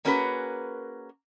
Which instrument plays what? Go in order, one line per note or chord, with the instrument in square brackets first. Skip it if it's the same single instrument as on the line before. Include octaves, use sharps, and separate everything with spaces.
[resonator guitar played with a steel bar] A#3 C#4 F#4 G#4 A#4 B4